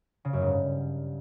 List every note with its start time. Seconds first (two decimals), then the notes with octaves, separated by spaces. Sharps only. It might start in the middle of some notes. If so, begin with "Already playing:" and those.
0.25 C#3
0.33 F#2
0.41 G#2
0.50 G2